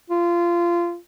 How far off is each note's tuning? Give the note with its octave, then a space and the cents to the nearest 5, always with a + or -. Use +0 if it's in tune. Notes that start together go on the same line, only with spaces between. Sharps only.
F4 -20